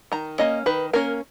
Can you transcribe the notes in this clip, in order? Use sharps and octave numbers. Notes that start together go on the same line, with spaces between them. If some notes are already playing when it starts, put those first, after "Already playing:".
D#3 A#5
A#3 C#4 D#5
D#3 B4
A#3 C#4 A#4